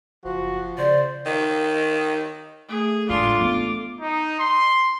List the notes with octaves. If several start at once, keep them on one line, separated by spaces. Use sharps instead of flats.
F#1 F3 F#4
C#3 C5 D5
D#3
A3 G#4
A1 G#3 D4 F4 C6
B3 D#4 D6
D#4
C6